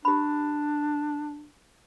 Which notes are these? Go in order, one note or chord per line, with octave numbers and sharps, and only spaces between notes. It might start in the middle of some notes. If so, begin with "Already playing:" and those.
D4 G4 B5